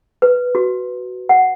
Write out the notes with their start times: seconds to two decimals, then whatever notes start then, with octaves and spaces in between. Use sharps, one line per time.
0.22 B4
0.55 F#4
1.29 F#5